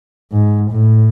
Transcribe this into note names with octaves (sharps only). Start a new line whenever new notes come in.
G#2
A2